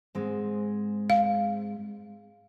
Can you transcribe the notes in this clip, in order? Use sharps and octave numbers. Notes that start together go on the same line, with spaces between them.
G#2 G#3 C4
F5